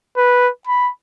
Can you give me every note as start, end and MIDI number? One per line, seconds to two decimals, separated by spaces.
0.17 0.49 71
0.67 0.90 83